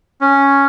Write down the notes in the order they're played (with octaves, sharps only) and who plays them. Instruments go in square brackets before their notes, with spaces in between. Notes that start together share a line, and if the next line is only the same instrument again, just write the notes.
[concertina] C#4